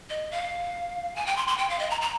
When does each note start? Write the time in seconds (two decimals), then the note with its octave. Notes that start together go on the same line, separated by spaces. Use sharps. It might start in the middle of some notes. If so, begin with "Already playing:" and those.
0.10 D#5
0.32 F5
1.16 G#5
1.26 G5
1.37 C6
1.47 C6
1.58 G5
1.70 F5
1.79 D#5
1.90 A#5
2.01 A#5